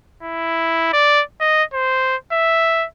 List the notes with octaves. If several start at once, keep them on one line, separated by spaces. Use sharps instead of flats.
E4
D5
D#5
C5
E5